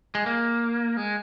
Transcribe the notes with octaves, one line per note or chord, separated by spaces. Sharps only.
G#3
A#3
G#3